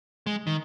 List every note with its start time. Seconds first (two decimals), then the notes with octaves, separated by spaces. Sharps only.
0.27 G#3
0.47 D#3